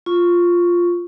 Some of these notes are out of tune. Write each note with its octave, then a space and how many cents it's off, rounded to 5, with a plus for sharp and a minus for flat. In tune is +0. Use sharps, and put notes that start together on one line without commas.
F4 +0 C#6 +0